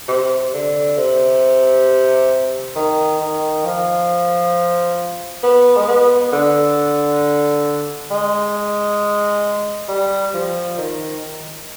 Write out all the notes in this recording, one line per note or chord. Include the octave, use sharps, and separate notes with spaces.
C3
D3
C3
D#3
D#3
F3
B3
G#3
B3
D3
G#3
G3
F3
D#3